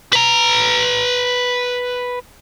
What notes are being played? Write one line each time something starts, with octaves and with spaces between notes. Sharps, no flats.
B4 A#5